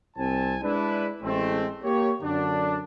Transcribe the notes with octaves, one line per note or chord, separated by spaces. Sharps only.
C2 C4 G#5 A5
G#3 D4 E4 B4
A1 G#3 A3 C4
A#3 G4 C#5
F#2 D3 D4